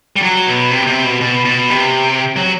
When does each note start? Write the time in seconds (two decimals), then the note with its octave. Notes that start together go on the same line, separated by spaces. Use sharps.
0.16 G3
0.22 F#3
0.47 B2
0.71 C3
0.87 C3
1.04 B2
1.21 B2
1.45 B2
1.70 C3
2.36 F#3